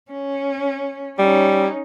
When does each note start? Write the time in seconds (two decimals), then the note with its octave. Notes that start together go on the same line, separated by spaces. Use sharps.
0.11 C#4
1.19 G3 C#4 D#4